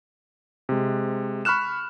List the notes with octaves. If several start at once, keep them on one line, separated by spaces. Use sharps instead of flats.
C3 G#3
B5 C#6 F6 F#6 E7